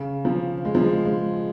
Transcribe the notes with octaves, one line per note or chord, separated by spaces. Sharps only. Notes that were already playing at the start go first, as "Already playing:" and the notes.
Already playing: C#3
F3
G#3
F3
G#3
G#3